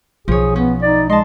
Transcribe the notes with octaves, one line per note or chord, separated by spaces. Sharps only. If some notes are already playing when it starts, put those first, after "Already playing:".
B1 F3 G#4 C#5
B3 C#4
D#4 D5
G#3 D#5 A5 C6